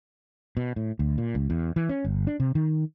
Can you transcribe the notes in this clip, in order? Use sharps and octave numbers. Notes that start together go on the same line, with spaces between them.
B2
A2
D2
A#2
C#2
E2
E3
C#4
G1
D4
C3
D#3